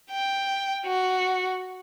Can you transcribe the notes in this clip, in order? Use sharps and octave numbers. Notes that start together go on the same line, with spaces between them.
G5
F#4